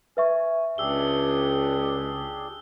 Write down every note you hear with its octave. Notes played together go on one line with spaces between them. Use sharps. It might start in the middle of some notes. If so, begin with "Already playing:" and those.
B4 E5 G#5 C#6
C#2 D4 G4 G#4 E6 G7